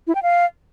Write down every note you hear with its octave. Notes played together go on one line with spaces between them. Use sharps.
E4
G5
F5